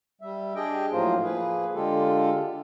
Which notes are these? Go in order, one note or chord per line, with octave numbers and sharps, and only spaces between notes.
G3 E5
D4 G4 G#4 D#5 G5
A2 F3 F#3 A#3 F4 C5
F3 A#3 G#4 B4
D3 G#3 F4 G4 A4